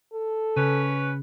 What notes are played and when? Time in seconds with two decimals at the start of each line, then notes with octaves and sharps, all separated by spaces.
0.13 A4
0.56 C#3 C#4 B4